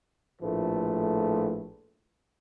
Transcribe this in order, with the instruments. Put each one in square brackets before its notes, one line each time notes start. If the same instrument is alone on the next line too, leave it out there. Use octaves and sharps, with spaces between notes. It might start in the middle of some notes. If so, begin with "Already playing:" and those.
[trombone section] A#1 A2 F3 A3 B4